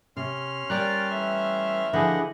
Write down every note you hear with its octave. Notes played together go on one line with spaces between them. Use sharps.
C3 C#4 C6 F6
G3 A#4 D5 G5 A#5 F#6
E3 A3 E5
D3 F3 E4 G4 G#4 D#5 F#5